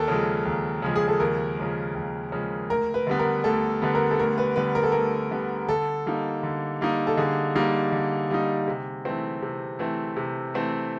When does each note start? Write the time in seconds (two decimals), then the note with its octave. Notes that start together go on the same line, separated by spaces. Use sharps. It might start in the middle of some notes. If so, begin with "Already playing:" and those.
Already playing: D#2 A4 A#4
0.08 C#3 F3 G#3
0.45 D#2
0.82 C#3 F3 G#3
0.96 G#4
1.08 A4
1.20 D#2 A#4
1.57 C#3 F3 G#3
1.95 D#2
2.32 C#3 F3 G#3
2.70 D2 A#4
2.94 B4
3.07 D3 G3 B3
3.19 A#4
3.44 D2 A4
3.82 D3 G3 B3
3.95 A#4
4.11 A4
4.19 D2 A#4
4.38 B4
4.56 D3 G3 B3 B4
4.75 A#4
4.83 A4
4.92 D2 A#4
5.31 D3 G3 B3
5.68 D3 A4
6.06 G3 A#3 D#4
6.43 D3
6.81 G3 A#3 D#4
7.07 A4
7.17 D3 G#4
7.55 G3 A#3 D#4
7.92 D3
8.30 G3 A#3 D#4
8.68 C3
9.05 E3 A3 C4
9.42 C3
9.79 E3 A3 C4
10.17 C3
10.54 E3 A3 C4